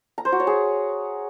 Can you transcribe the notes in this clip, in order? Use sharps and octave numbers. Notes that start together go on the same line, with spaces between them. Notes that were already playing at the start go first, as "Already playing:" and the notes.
A#5
C5
F#4
C#5
G#4